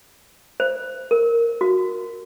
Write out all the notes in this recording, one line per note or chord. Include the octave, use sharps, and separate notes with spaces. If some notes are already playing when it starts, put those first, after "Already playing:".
C5
A#4
F#4